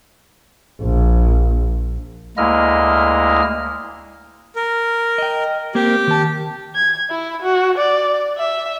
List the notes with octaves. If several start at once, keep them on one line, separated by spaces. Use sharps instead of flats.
A#1
D2 G#3 A#3 E4 D#5 F6
A#4
D#5 G5
A#3 C4 G4 A#4
D#3 A5
G#6
E4
F#4
D5
E5